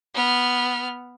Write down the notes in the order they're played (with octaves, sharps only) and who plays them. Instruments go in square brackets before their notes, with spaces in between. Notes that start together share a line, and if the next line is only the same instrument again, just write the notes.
[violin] B3 F6